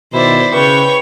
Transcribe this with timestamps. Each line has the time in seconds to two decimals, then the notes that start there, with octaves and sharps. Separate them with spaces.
0.13 B2 D#3 E4 C5 D5
0.54 C#3 B4 C#5 G5 C#6